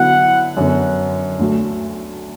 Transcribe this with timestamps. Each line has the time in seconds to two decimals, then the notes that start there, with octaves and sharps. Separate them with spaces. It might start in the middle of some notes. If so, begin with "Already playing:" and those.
Already playing: D3 F#3 B3 E4 F#5
0.57 F#2 D3 B3
1.39 D2 D3 A3 F#4